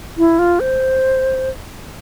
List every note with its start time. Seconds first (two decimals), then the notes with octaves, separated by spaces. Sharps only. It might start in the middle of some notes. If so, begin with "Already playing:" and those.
0.18 E4
0.39 F4
0.60 C5